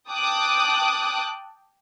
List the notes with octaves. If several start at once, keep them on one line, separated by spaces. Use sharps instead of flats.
G5 A5 D6 D#6 F#6